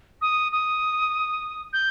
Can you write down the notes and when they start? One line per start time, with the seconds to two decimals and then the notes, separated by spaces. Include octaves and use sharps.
0.22 D#6
0.52 D#6
1.73 G6